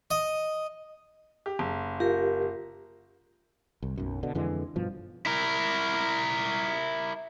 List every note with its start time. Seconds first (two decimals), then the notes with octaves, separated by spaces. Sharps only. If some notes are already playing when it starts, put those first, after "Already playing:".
0.11 D#5
1.46 G4
1.59 F#1
2.00 F4 G4 A#4
3.82 C2
3.98 B1 F#2
4.23 B2 D3
4.35 F2 D3 E3 G#3
4.76 G2 B2 F3
5.26 E4 A#4